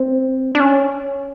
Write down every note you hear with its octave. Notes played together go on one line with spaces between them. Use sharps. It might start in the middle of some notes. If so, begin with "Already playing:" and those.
Already playing: C4
D4
C#4